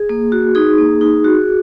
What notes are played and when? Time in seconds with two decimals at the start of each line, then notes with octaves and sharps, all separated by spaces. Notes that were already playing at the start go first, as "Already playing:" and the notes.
Already playing: G#4
0.09 A#3
0.32 F#4
0.55 D#4 G#4
0.78 A#3
1.01 D#4
1.24 F#4